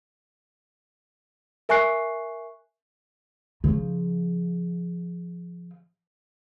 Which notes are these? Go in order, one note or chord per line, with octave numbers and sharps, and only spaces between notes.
A#4 E5 G#5 C#6 F#6 C7
C#3 F3